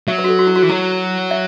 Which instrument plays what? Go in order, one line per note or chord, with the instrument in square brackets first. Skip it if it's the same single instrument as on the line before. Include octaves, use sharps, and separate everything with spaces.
[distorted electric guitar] F#3 [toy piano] E5
[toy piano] B4
F#4
A4
F#4
E4
F#4
[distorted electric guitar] E3
[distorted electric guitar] F#3 [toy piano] E4
[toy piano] E5